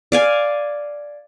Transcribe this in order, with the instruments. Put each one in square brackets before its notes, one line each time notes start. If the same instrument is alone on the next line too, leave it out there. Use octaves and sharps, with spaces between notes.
[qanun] D5 F5 G#5